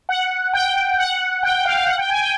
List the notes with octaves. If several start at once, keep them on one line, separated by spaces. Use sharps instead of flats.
F#5
G5
F#5
G5
G5
F5
F5
F#5
G5
G#5
G5